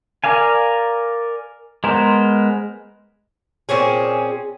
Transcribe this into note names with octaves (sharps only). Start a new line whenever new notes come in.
A#4 D5 F5 G#5
G#3 B3 A#4 C5
A#2 C4 C#4 G#4